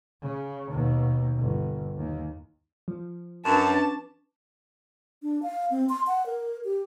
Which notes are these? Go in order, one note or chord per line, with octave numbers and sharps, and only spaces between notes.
C#3
D#2 B2
G1
D#2
F3
F#2 C#4 D4 B4 A5
D4
F5
C4
C6
F#5
A#4
G4